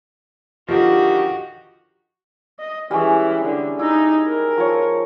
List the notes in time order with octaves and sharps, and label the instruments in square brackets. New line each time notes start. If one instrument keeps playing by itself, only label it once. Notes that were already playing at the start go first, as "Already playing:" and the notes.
[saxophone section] D3 D#3 G4 [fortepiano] F3 [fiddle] F#4
[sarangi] D#5
[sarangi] E3 [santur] G3 G#3 C#4
[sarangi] D3
[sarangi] D#4 [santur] E4
[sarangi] A#4
[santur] F3 C#5